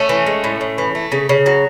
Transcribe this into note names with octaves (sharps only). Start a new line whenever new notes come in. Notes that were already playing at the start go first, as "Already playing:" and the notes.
Already playing: A3 C#4
E3
G#3
A2
A2
E3
A3
C#3
C#3
F#3